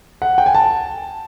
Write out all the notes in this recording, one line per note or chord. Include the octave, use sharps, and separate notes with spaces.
F#5
G5
G#5
A5